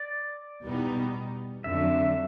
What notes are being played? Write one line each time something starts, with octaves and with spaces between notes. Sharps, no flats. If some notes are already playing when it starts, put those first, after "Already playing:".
Already playing: D5
E2 B2 G3 B3 D#4
F2 D3 F#3 E5